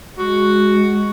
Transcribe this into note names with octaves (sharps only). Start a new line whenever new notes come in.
G#3 F#4